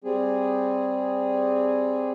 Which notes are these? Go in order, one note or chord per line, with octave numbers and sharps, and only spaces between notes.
G3 C4 G#4